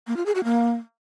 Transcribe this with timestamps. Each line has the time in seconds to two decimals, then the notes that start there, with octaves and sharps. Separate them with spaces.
0.07 A#3
0.17 F4
0.26 G#4
0.35 F#4
0.44 A#3